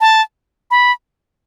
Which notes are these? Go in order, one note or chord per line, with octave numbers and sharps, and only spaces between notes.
A5
B5